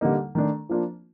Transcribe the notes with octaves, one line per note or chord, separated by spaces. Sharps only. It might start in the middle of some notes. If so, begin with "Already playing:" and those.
D3 G3 A#3 D#4
D#3 A3 D4
F3 A#3 D4 F4